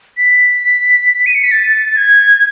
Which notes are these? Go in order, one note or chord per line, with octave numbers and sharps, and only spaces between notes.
B6
D#7
C#7
B6
A6
G#6